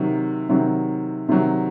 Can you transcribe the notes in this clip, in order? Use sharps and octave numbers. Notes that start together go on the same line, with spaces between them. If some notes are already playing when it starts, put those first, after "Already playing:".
Already playing: C3 D#3 F#3
C3 D#3 F#3
C3 D#3 F#3